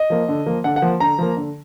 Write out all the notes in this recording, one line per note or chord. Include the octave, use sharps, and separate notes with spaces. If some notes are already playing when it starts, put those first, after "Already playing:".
Already playing: D#5
F3 A#3
D3
F3 A#3
D3 F#5
F#5
F3 A#3
D3 A#5
F3 A#3
D3